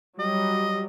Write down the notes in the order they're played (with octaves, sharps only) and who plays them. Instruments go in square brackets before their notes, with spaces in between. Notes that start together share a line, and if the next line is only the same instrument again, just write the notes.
[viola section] F#3 G3 [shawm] D#5